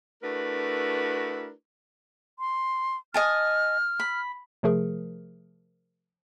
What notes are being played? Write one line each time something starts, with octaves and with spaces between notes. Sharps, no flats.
A3 D4 E4 F#4 A#4 B4
C6
D#5 G#5 A5 F6
B5
C3 F3 A3 G#4 A#4